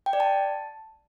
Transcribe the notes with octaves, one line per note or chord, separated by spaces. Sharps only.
G5
D5
A5